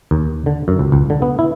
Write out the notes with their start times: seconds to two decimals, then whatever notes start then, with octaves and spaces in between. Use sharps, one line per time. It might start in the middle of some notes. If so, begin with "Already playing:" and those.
0.11 D#2
0.46 D3
0.68 F#2
0.79 C#2
0.92 C#2
1.10 D3
1.22 B3
1.39 E4